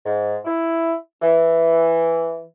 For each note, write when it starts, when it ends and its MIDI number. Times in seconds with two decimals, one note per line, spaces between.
0.05 0.36 44
0.45 0.94 64
1.21 2.43 52